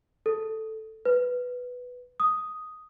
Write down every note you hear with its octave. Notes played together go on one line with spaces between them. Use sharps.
A4
B4
D#6